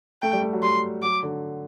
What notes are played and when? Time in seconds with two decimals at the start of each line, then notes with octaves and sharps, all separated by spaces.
0.22 A3 G5
0.33 G3
0.42 A3
0.53 F#3
0.63 G3 C6
1.02 F#3 D6
1.23 D3